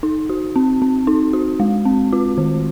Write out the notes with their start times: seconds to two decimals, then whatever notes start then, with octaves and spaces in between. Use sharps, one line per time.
0.03 D#4
0.29 F#4
0.56 C4
0.82 C4
1.07 D#4
1.33 F#4
1.60 G#3
1.85 C4
2.13 F4
2.38 D#3